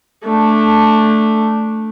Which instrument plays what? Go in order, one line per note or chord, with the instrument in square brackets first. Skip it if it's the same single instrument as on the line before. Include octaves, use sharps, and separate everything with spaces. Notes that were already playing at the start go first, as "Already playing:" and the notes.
[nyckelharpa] A3 D4